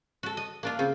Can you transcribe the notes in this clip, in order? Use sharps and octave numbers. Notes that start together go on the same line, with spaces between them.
F#4 A4
D#5
A#3 D4 F4
C#3 C4 F4